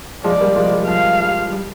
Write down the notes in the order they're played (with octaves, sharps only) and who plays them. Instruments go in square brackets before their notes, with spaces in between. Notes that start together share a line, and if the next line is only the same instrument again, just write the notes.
[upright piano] F3 G#3 [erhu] D5
[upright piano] G3 A#3
F3 G#3
G3
[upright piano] F3 [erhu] F5
[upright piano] G3
G3